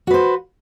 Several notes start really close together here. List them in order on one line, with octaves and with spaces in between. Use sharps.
F#4 B4 C5